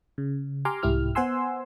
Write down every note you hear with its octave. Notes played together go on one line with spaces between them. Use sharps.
C#3
G4 G#5 A#5 C6 D6 F6
C2 G#2 E4 G4 F6
B3 C5 F#5 G#5 C6 E6